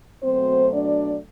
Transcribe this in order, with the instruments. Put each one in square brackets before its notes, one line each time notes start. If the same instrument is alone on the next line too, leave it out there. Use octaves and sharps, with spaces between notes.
[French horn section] B2 F#3 A3 C4 C5
D4 D5